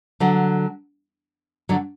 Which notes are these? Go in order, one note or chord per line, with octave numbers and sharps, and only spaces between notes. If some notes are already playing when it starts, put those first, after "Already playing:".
D3 F#3
D3 F#3